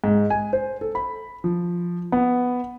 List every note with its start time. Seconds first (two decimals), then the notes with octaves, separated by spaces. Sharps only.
0.04 G#2
0.30 G#5
0.53 C5
0.81 A4
0.95 B5
1.44 F3
2.12 B3